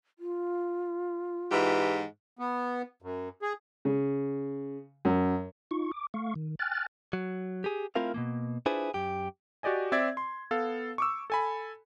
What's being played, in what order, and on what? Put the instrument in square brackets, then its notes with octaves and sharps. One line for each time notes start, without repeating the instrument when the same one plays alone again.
[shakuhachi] F4
[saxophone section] G#2 E3 G4
[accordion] B3
F#2
G#4
[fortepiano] C#3
F#2
[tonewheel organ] D#4 F4 C#6
D6
A3 F5 C#6
D#3
G5 G#5 F6 F#6 A6
[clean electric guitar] F#3
G4 G#4
A3 C4 E4 F4 A#4 F5
B2 F3 A#3
D4 E4 F4 G#4 B4 C5
F#2 G4
[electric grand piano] F#4 G4 D5 D#5 G#5
C4 D5 E5 G#6
C6
B3 A4 F5
C#6 D6 E6
A4 G#5 B5